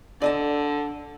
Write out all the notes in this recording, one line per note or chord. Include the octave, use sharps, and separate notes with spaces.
D3 D5 D#5 A5